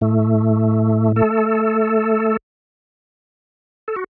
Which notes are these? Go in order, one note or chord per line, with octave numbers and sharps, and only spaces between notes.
A2 A3
A3 A4
A4
F#4